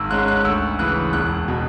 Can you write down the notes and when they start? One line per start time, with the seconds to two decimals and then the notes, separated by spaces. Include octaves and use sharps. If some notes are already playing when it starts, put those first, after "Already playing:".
Already playing: G#1 E6
0.10 G#2 G#3 C#4 F#6
0.28 F#6
0.45 D2 E6
0.79 C#3 E3 F#6
1.13 E1 F#6
1.48 B2